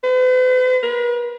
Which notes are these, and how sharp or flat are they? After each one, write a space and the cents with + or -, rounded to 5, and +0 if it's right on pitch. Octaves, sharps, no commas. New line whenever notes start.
B4 +45
B4 -45